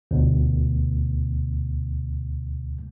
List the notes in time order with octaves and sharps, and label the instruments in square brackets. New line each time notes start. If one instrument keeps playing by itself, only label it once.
[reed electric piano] D2 B2